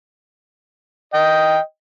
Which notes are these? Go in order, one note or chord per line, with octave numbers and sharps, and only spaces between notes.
D#5 G5